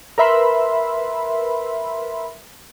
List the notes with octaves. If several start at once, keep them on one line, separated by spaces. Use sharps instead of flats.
A#4 B4 E5 B5 C6